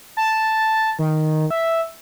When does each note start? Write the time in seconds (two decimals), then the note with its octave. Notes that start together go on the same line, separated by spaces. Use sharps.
0.17 A5
0.99 D#3
1.51 E5